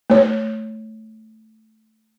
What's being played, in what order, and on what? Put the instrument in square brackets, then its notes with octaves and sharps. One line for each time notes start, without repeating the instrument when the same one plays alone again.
[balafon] A3 C#5